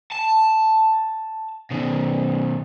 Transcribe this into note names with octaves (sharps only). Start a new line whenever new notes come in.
A5
B2 D#3